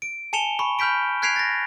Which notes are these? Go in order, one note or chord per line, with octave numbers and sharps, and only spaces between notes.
D7
G#5 A5 C#7 E7 F7 G7
B5 C#6
B5 F6 G6 B6 D7
F#6 G#6 B6 C7 D7 F7
A6 A#6